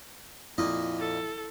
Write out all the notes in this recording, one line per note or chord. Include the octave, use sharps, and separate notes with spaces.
F2 A#2 E4 D#5
A4